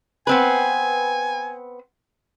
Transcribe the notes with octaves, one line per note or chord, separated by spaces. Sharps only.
B3 C4 B4 G#5